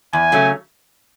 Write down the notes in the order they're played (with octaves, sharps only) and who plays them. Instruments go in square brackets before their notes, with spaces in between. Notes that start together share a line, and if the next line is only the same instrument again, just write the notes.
[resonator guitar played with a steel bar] E2 [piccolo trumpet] G#5
[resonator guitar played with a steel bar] C#3 F#3 A3 C#4